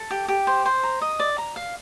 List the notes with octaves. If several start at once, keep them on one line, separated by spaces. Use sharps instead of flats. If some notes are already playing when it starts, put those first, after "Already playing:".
Already playing: A4
G4
G4
C5
C5
A#5
D#5
D5
A#5
F5